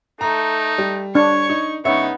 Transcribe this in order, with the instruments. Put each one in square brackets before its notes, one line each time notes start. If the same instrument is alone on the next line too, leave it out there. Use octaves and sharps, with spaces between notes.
[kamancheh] A3 [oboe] D#4 [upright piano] A#5
[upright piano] G3
[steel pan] D4 [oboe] C#5 [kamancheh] C#6
[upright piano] D#4
[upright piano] C#2 C#5 E5 [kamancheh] B3 D#4 [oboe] C#6